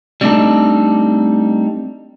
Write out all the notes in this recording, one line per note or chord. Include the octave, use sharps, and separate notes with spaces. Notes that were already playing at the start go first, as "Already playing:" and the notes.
G3 A3 C4 D4 D#4 A4